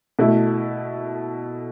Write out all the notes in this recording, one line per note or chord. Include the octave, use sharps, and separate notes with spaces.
B2 A3 E4